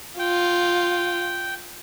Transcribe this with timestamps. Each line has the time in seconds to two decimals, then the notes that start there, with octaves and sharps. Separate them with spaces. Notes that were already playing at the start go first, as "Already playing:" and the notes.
0.19 F4 G5